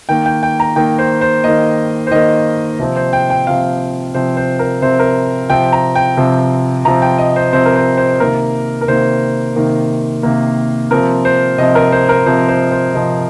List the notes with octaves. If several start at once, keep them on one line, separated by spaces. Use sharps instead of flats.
D#3 A#3 G5
G5
G5
A#5
D#3 A#3 G5
C5
C5
D#3 A#3 D#5
C5
D#3 A#3 D#5
C3 F3 C4 C5
C5
G5
G5
C3 F3 C4 F5
C3 F3 C4 C5
C5
A#4
C3 F3 C4 C5
A#4
C3 F3 C4 G5
A#5
G5
C3 F3 C4
C3 F3 C4 A#5
G5
D#5
C5
C3 F3 C4 C5
A#4
C5
C5
C3 D#3 A#3 A#4
A#4
C3 D#3 A#3 C5
C3 D#3 A#3
C3 D#3 A#3
C3 F3 C4 A#4
C5
C3 F3 C4 D#5
A#4
C5
A#4
C3 F3 C4 C5
C5
C5
C3 F3 C4 D#5